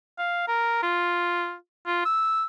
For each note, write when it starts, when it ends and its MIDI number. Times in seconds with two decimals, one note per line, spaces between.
0.18 0.43 77
0.48 0.80 70
0.83 1.54 65
1.87 2.05 65
2.05 2.45 88